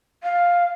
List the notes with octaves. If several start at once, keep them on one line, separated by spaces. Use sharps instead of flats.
F5